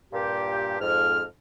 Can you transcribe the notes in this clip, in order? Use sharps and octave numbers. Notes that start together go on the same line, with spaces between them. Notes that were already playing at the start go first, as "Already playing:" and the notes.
G2 A#2 G4
F2 G#2 F6